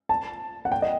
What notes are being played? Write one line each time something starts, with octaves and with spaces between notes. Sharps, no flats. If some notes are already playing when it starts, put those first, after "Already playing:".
A5
F#5
G5
D#5